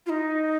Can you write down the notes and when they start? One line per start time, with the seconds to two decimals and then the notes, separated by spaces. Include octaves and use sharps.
0.06 F4
0.09 D#4